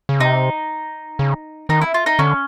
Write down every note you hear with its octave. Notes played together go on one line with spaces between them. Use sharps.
C#3
C3 D#4
C#3
D#3 D#4
E4
F4
D#4
D3 C#4